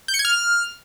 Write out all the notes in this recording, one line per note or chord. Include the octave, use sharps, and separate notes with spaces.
G6
C#7
G#6
F6